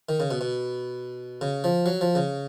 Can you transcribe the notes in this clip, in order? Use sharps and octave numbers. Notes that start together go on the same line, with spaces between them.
D#3
C#3
B2
B2
C#3
F3
F#3
F3
C#3